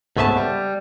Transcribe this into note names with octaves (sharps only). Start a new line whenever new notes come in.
C#2 G#2 A3 B3 E5 A5
G3